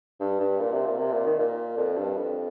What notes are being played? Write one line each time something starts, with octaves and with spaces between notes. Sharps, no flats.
G2
G2
A#2
C3
A#2
C3
A#2
D#3
A#2
F2
G2
F2